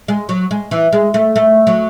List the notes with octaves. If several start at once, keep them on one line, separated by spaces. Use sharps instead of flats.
G#3
F#3
G#3
E3
G#3
A3
A3
F#3